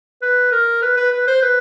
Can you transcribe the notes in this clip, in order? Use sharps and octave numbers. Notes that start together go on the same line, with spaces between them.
B4
A#4
B4
B4
B4
C5
B4